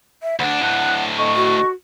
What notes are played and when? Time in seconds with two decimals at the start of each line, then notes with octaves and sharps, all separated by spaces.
0.23 E5
0.40 D2 D4 F#5
0.61 D2 A2 F#6
1.17 A4 D#5 C#6
1.36 F#4